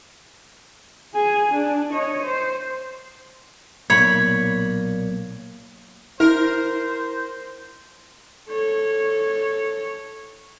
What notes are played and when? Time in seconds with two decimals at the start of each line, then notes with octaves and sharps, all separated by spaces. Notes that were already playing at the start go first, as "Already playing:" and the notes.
1.14 G#4 G#5
1.52 D4
1.91 C#5 D#5
2.23 C5
3.90 B1 A#2 A#3 C#5 B5 G#6
6.20 E4 A#4 C5
8.49 A4 C#5